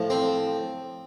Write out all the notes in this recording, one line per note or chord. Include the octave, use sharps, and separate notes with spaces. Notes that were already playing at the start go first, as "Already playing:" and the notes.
Already playing: A2 F3 A3
C4